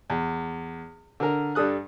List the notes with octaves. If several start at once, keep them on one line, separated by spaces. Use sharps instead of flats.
E2
D3 A#4
G2 G3 A4 D#6 F#6